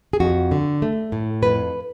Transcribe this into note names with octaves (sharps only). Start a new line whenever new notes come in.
G#4
F2 F#4
D3
A3
A2
F2 B4